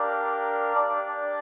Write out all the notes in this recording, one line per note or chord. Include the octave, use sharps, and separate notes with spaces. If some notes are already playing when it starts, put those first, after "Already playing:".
Already playing: D4 G4 A#4 D5 F5
D4 G4 D5